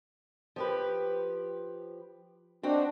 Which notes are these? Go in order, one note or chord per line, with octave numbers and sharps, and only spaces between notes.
F3 G4 B4
C4 D4 D#4 F#4